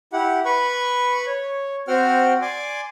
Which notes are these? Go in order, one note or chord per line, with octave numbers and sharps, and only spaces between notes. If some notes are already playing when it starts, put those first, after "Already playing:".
E4 G4 F#5
B4 B5 C#6
C#5
C4 F#4 C5 F#5 G5 F6
D5 G#5 C6 D6